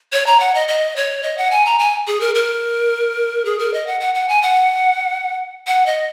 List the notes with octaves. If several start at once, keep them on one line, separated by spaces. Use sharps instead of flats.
C#5
A#5
F#5
D#5
D#5
C#5
D#5
F#5
G#5
A#5
G#5
G#4
A#4
A#4
G#4
A#4
D#5
F#5
F#5
F#5
G#5
F#5
F#5
D#5